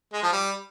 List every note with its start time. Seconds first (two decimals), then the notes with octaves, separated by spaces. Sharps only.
0.13 G#3
0.23 F3
0.32 G3